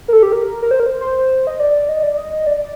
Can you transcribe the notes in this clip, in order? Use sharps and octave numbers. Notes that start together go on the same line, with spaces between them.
A#4
A4
G4
A#4
A#4
C5
A#4
C5
C5
D#5
D5
D#5
D5
D#5
D5